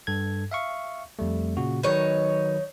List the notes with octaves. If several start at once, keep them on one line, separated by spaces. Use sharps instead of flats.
G2 A4 G#6
E5 F5 C#6
F2 G3 A3
A#2 C#3 F#4
D#3 F#3 D#4 B4 C#5